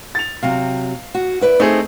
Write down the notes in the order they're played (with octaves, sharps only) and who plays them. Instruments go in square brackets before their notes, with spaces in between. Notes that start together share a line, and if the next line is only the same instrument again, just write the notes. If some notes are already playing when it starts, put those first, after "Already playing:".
[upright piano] A6 F7
[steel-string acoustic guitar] C3 F#3 [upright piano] F5
[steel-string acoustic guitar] F#4
E4 B4 D5
[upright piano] A3 C4 G#4 [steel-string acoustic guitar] D#4